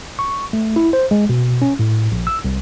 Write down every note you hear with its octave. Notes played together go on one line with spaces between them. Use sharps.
C#6
A3
E4
C5
G#3
B2
C#4
A2
A#1
E6
C2